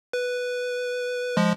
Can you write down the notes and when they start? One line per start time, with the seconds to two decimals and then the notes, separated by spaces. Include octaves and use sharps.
0.13 B4
1.37 F3 G#3